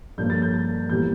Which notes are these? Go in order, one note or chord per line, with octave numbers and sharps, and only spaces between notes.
G2 F3 A#3 G6
A6
G6
A6
E2 E3 G3 A#3 G6